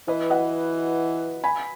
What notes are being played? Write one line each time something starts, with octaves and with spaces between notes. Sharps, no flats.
E3 B4 D#5
D#5 F#5
G#5 B5